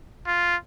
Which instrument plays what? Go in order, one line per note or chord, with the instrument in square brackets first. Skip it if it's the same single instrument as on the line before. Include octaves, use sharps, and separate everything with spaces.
[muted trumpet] F4